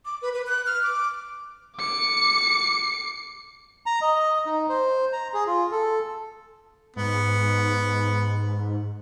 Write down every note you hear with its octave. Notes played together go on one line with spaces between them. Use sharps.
D6
B4
B4
F#6
F6
D6
D6 C#7
A#5
D#5
D#4
C5
A#5
G#4
F4
A4
G#2 B3